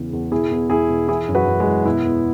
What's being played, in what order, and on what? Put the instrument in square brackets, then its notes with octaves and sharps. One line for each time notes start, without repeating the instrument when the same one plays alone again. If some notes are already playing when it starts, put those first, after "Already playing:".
Already playing: [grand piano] E2 C#3 E3
E2
B2 E4 G#4
E2
E2 E4 G#4
B2
E3 E4 G#4
F#2
F#4 B4
F#2
G#3
E3
B2 B3 E4
E2